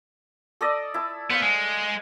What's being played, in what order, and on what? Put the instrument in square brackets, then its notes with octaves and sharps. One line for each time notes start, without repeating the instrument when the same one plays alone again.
[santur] A4 D5 D#5
E4 A5
[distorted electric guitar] B3 [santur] C5 F5
[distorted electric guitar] G#3